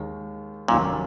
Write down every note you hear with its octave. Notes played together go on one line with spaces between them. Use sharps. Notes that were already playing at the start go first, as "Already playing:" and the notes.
Already playing: D#2 D#3 G#3
F1 D#2 A#2 D#3 F#3 C#4